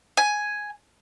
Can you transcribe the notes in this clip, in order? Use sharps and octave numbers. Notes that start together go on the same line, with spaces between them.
G#5